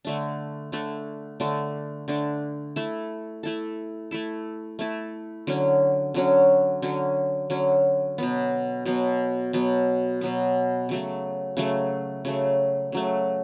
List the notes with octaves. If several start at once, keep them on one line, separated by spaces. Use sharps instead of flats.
D3 A3 D4
D3 A3 D4
D3 A3 D4
D3 A3 D4
A3 E4 A4
A3 E4 A4
A3 E4 A4
A3 E4 A4
D3 F#3 C#4
D3 F#3 C#4
D3 F#3 C#4
D3 F#3 C#4
B2 F#3 B3
B2 F#3 B3
B2 F#3 B3
B2 F#3 B3
C#3 F#3 A3
C#3 F#3 A3
C#3 F#3 A3
C#3 F#3 A3